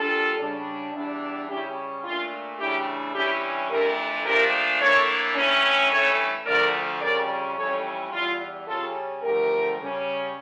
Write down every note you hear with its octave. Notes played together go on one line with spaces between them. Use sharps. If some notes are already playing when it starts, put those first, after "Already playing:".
Already playing: A#2 G3 D4 F4 A4
C#3 G3 D4
E2 E3 G3 D4
C#3 G3 C#4 E4 G4
A#2 A3 D4 F4
C#3 E3 A3 D4 E4 G4
G2 E3 G3 C#4 E4 G4
F2 E3 A3 D4 G4 A#4
A#2 F3 A3 D4 G4 A#4
A2 E3 A#3 D4 A4 C#5
G2 E3 A3 C#4
G2 E3 A3 C#4 A4 C#5
D2 D3 F3 A3 A#4 D5
F2 C#3 G3 C#4 A#4 D5
F2 E3 G3 C#4 A4 C#5
E2 E3 G3 F4
C#3 G3 C#4 F4 A4
E2 D3 F3 A3 G4 A#4
C#3 G3 C#4